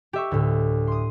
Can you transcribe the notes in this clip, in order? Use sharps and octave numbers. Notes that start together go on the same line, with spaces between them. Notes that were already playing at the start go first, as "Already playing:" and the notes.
G4 E5 C#6
D2 A2
C6 D#6